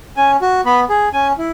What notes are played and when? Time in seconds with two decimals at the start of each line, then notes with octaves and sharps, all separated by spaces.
0.17 C#4 G#5
0.42 F#4
0.65 B3 B5
0.89 G#4
1.13 C#4 G#5
1.38 E4